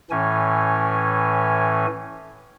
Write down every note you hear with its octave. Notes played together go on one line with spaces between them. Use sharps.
A2 E3 C#4 G#5